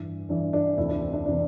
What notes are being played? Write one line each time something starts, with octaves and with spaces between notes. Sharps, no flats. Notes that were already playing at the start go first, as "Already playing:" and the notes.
Already playing: G2 E3
G2 E3 D4
D4
D2 C3 E3 E4
D4
C4
D4
C3 E3 D4